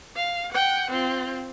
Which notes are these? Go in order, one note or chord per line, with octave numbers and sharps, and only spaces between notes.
F5
F#5 G5
C4 F4